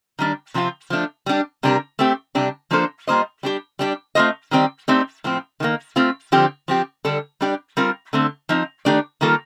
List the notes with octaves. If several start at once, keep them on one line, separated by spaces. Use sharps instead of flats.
D#3 G3 D4
C3 F3 C4 F4
F3 A3 D4
G3 D4 G4
C3 G3 D4 G4 A#4
A3 C4 G4
C3 G3 D4 G4
F3 A#3 D4 A4 C5
G3 A#3 F4 C5 D#5
G3 D4 G4
G3 D4 G4 D5
A3 C4 F4 C5 D#5
D#3 G3 C4 G4 D5
A3 C4 D#4 G4 D5
A2 F3 C4
D#3 G3 A#3
A3 C4 F4
D3 F3 C4 G4
F3 C4 G4
D3 G3 D4 A4
G3 D4 G4 D5
G3 C4 F4 A#4
D3 A3 C4
F3 C4 D#4
D#3 A3 D4 G4 D5
D#3 G3 A#3 F4 A4